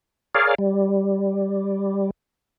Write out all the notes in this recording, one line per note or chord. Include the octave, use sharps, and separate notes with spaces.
G#4 A#4 C#5 D5 F5
G3